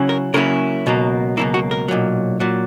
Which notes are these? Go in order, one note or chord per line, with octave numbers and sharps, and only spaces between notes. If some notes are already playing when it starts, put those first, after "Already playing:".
Already playing: C#3 F#3 C#4 E4
A#4
C#3 F#3 A#3 C#4 E4 A#4
C#2 B2 F#3 A#3
C#2 B2 F#3 A#3 E4
F#4
A#4
B1 A#2 F#3
A#2 F#3